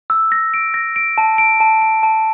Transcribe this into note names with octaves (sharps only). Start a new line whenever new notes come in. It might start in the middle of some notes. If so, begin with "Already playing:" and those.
E6
A#6
D7
A#6
D7
A5
D7
A5
D7
A5